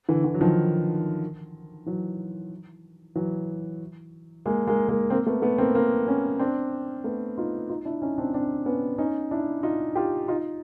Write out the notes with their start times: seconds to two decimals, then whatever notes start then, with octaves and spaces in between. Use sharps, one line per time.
0.09 D3 E3
0.24 D3 E3
0.34 F#3
0.41 D#3 F3
1.86 E3 F#3
3.15 E3 F#3
4.46 G#3 A#3
4.67 G#3 A#3
4.89 G#3 A#3
5.10 A#3 C4
5.26 A3 B3
5.42 A3 B3
5.58 A#3 C4
5.75 A#3 C4
6.08 B3 C#4
6.39 C4 D4
7.04 A3 B3
7.38 D#4 F4
7.69 D#4 F4
7.85 D4 E4
8.02 C#4 D#4
8.18 C4 D4
8.34 C4 D4
8.66 B3 C#4
8.98 C#4 D#4
9.31 D4 E4
9.63 D#4 F4
9.95 F4 G4
10.28 D#4 F4